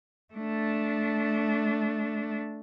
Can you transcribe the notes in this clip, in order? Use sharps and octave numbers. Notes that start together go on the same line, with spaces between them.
A3 D4